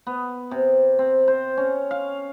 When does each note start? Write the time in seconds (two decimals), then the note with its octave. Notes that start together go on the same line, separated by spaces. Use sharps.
0.07 B3
0.51 C3
0.99 C4
1.28 C5
1.57 C#4
1.91 F5